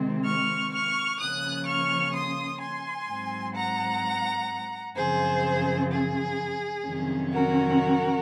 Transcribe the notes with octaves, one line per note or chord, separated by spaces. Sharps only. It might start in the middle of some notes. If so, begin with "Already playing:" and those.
Already playing: C3 D#3 G#3 C4
C#6 F6
C#6 F6
C#3 F3 A#3 C#4 D#6 F#6
C#6 F6
C6 D#6
G#5 C6
G#2 F#3 C4
F#5 A#5
F#2 C#3 F3 C4 G#4 C5
G#4
F2 C3 D#3 F#3 C#4
F#4 A#4